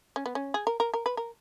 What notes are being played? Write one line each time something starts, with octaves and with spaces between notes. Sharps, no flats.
C#4
B3
C#4
G#4
A#4
A#4
A#4
B4
A#4